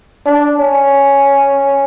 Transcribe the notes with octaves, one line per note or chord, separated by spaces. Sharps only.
D4
C#4